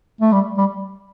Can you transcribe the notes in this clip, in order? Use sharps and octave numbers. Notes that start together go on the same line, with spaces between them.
A3
G3
G3